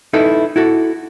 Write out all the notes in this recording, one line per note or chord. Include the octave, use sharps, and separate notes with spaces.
D#4 E4 A4 B4
E4 F#4 A4